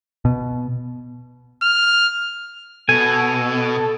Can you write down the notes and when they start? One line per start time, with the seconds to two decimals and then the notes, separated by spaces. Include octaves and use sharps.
0.25 B2
1.62 F6
2.89 B2 A4 G#5